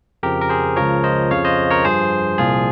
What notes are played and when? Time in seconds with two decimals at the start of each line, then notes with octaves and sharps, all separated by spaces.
0.23 F2 C#3 F3 G4 A#4
0.41 A#4
0.49 G#4 C5
0.76 C#2 C#3 F3 A#4 C#5
1.04 C5 D#5
1.31 F2 C#3 F3 C#5 F5
1.45 C5 D#5
1.71 A#4 C#5
1.84 G2 F3 G#4 C5
2.38 C2 A#2 F3 F4 G#4